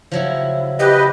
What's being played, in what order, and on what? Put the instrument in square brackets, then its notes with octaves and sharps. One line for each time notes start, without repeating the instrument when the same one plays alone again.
[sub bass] C#3 [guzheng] F3 F#3 E4
[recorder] G4 [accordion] B4 D#5